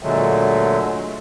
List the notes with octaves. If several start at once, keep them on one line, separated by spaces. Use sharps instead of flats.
A#2 D3 F#3 G#3 A3